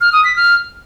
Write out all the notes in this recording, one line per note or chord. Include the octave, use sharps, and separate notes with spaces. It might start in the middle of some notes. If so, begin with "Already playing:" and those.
F6
D#6
B6
F6